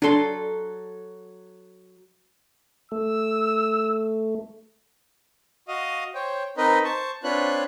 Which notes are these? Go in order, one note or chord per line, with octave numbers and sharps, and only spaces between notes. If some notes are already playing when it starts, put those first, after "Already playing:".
F#3 D4 A4 C6
A3 E6
F#4 D#5 F5 D#6
C5 C#5 G5
C4 D#4 A#4 B4 D#5
C5 A5 C#6
C4 D4 F4 B4 C#5 F#6